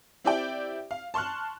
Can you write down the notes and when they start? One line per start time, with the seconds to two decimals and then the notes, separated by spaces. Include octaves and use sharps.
0.24 C4 E4 G4 D5 E5 G5
0.91 F5
1.14 A5 C6 C#6 F6 F#6